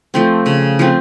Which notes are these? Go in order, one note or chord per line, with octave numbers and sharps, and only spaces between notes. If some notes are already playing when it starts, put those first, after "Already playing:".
F3 A3 C4
C#3
F3 A3 C4